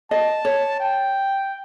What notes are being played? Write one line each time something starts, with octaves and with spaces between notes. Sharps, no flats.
D#5 A5
C#5
G5